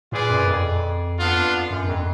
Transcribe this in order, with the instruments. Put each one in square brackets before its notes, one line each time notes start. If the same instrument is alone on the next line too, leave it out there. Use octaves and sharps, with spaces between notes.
[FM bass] A#2 [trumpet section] F4 G#4 B4 D5
[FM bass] F#2
F2
[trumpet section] B3 D4 F4
[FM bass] F#2
F2